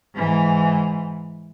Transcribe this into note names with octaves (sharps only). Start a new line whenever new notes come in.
G#2 E3